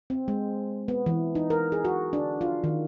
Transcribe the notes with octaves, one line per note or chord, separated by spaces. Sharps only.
C4
G#3
B3
E3
D#4
A#4
G#4
F#4
D4
F4
D#3